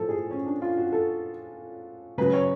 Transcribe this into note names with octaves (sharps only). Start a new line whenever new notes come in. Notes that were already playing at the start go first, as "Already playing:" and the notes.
Already playing: A2 F3 A4
G#4
C#4
D4
F4
F#4
A4
C#3 F#3 B4
C#5